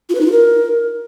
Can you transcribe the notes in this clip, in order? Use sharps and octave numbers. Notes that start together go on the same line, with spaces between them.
F4
B4
D#4
F4
A#4